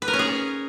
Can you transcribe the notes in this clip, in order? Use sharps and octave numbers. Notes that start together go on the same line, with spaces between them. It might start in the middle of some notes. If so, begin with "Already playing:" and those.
B4
A#4
C#4
G#4